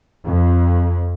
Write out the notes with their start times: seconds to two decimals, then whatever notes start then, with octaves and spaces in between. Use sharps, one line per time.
0.25 F2